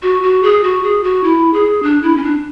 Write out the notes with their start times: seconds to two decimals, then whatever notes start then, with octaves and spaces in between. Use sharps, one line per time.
0.02 F#4
0.23 F#4
0.43 G#4
0.63 F#4
0.83 G#4
1.03 F#4
1.24 E4
1.54 G#4
1.83 D4
2.03 E4
2.17 C#4
2.23 D4